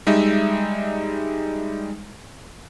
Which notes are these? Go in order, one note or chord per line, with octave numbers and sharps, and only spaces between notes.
G3 G#3 D#4 E5